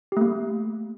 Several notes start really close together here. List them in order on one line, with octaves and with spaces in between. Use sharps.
G4 A3 A#3